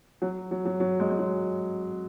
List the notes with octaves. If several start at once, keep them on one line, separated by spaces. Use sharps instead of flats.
F#3
F#3
F#3
F#3
G#3
G#3
F#3